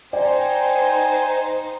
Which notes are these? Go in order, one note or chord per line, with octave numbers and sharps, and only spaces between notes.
D#4 C5 D5 G5 G#5